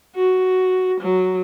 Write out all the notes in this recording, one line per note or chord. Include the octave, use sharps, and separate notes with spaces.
F#4
F#3